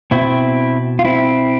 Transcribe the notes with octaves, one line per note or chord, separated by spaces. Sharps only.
B2 C4 E4
F4
C4 E4